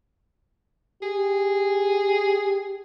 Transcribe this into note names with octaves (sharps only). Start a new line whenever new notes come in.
G4 G#4